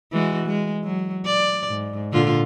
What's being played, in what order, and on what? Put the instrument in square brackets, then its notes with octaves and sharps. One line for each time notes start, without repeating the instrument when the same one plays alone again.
[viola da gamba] E3 G#3 F#4
G#3
F#3
D5
G#2
A#2 D3 F4